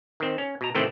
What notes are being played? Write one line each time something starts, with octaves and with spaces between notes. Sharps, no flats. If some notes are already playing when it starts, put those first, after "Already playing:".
D#3 C4
C#4
B2 A#5
A2 C3 D#3 E3 A3 C4